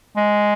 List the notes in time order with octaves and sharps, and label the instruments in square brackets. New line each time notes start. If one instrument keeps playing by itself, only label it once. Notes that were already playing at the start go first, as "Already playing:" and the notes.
[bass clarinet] G#3